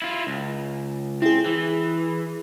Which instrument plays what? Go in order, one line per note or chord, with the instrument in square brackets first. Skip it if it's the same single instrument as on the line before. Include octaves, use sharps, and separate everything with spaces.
[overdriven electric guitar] E4 F4
C#2
[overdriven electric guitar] C4 [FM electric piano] E4 G#4
[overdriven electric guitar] E3